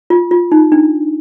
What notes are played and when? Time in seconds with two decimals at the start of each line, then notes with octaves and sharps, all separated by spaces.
0.10 F4
0.31 F4
0.52 D#4
0.72 D4